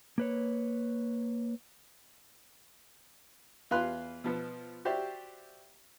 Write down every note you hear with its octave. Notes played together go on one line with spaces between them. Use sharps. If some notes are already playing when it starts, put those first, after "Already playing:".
A#3 B4 C#5
E2 F4 B4 F5 C6 F#6
B2 F3 B3
F#4 G4 C5 D5 E5